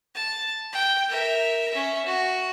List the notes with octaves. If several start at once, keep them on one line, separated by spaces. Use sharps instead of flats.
A5
G5
A#4 E5
C#4 E5
F#4